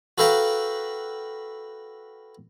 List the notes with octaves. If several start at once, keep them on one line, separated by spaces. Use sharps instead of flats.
F#4 A4 B4 F5 G5 A#5